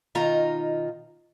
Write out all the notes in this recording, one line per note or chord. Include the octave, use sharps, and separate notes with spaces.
B2 D#3 D#4 F4 A#5